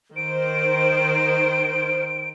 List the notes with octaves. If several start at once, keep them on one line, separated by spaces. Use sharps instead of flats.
D#3 C5 D7